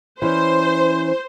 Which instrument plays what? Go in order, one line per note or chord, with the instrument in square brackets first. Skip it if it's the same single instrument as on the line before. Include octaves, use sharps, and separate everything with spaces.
[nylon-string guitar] E3 C#4 D5 [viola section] C5